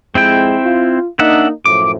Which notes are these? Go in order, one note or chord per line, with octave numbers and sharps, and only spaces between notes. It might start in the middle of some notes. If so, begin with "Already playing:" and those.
F2 G#3 C4 E4 G5
F4
A#3 D4 D#4 E5 F#5
F#2 A2 F3 D6